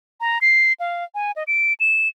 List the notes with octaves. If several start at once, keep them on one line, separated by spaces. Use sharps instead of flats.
A#5
C7
F5
G#5
D#5
D7
E7